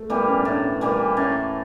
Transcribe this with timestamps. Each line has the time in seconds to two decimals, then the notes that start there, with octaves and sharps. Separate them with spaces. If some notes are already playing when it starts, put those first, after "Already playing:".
Already playing: A3
0.10 E3 G3 A#3 B3
0.28 C#4
0.39 D4
0.45 A2
0.51 C#4
0.81 E3 G3 A#3
1.17 A2 C#4